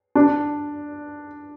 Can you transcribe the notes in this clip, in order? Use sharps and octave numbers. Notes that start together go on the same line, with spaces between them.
D4